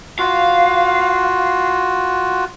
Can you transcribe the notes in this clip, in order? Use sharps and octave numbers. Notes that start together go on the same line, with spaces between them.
F4 F#4 F5